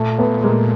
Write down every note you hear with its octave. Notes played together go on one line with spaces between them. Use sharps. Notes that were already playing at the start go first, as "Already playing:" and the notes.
Already playing: A#2 A3
A3 B3
G#3 A#3